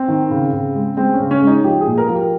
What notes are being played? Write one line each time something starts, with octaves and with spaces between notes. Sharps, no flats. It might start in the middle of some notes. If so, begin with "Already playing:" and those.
Already playing: C4
D#3
C#3
C#3
G#3
G#3 C4
C#4
C#3
C#4
G#3
D#4
F3 G4
G#4
A#2
A#4
F3
G4